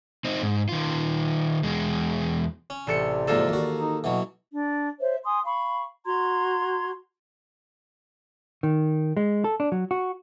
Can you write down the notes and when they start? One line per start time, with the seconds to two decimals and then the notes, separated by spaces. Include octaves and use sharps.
0.25 C4 D#4
0.42 G#2
0.69 D#3 F4
1.63 E2 G#3
2.70 C#4
2.87 A1 C3 A4 D5 C#7
3.28 G#2 D3 F3 A#3 A4
3.49 D#2 F#4
3.78 D#4
4.04 B2 E3 F#3 F#5
4.53 D4
5.00 C5 C#5 E5
5.25 G#5 C6 D#6
5.45 F5 B5 C#6
6.05 F#4 A#5 C6 G#6
8.63 D#3
9.17 G#3
9.44 A4
9.60 D4
9.72 F#3
9.91 F#4